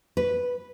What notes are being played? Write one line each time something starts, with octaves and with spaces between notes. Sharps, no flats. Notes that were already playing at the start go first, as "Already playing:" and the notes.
B4